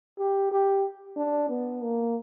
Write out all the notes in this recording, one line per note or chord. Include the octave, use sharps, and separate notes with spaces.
G4
G4
D4
B3
A#3